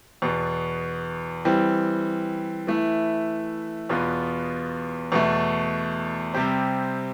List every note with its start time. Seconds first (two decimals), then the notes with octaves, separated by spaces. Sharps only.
0.22 E2 B2 B3
1.45 E3 G3 C4
2.67 E3 A3 E4
3.89 E2 B2 B3 F4 B4
5.12 E2 B2 A3
6.34 C3 G3 C4 G4 C5